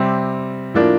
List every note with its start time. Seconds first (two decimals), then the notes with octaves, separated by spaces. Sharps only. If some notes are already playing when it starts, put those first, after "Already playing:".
Already playing: C3 G3 C4
0.74 A2 F3 A#3 D4